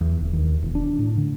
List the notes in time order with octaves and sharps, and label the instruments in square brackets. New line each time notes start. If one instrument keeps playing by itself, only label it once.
[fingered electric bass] E2
D1
D#2
E1
D4
A2
D3